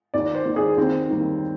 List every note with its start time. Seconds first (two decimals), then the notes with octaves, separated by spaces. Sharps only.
0.14 D#2 D5
0.35 C5
0.45 D#3 A#3
0.56 G#4
0.77 D#2 C4
1.09 D#3 G3 A#3